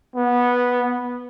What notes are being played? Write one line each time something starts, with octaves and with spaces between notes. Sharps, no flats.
B3